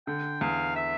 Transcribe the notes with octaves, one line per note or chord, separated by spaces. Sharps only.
D3 G5
E2 F5
E5